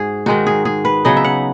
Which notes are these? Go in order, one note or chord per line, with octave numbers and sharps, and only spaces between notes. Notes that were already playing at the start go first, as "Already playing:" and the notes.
Already playing: G#2 F#4 G#4
D#3 G#3 D#4 F#4
G#4
G#4
B4
C#3 F#3 B3 D#4 D#5
E5
F#5